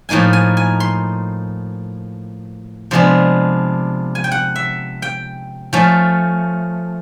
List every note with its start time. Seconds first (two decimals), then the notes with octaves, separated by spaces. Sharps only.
0.09 A2 F3 A#3 D#4 G#5
0.33 G#5
0.57 G#5
0.80 C6
2.91 C3 F3 G#3 B3 D4
4.15 G#5
4.24 G5
4.32 F#5
4.56 E5
5.02 G5
5.73 F3 A3 C#4